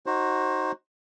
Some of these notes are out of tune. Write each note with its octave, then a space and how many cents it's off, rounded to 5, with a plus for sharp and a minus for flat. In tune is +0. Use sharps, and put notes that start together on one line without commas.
D#4 +0 F#4 +10 C5 +25